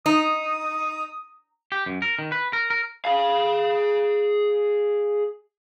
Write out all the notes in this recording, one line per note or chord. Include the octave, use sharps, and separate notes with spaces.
D#4 D#6
G4
F#2
A#4
D#3
B4
A#4
A#4
G#4 F5